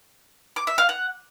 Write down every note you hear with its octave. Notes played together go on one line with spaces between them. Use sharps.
D6
E5
F5
F#5